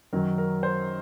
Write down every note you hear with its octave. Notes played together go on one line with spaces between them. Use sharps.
F#2 D#3 F#3 A#4
A#4
C5